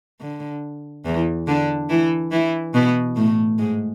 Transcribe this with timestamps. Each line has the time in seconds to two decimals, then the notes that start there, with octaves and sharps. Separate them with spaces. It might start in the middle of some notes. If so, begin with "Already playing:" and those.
0.20 D3
1.05 E2 E3
1.47 D3 D4
1.90 E3 E4
2.32 E3 E4
2.74 B2 B3
3.16 A2 A3
3.58 G#2 G#3